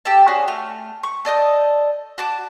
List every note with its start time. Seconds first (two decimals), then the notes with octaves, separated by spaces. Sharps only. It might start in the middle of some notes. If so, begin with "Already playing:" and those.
0.05 G4 A4 A5
0.27 C#4 D4 F#4 G#4
0.48 A3 F6
1.03 C#6
1.25 A4 D5 D#5 G6
2.18 F#4 A5 D6